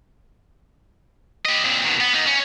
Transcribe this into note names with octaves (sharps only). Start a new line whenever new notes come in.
G4 D#5
A#2 C4
B2 D#3
B3
A#3 D#4
C#4